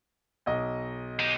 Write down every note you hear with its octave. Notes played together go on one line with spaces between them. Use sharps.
B1 D#5
D#4 G4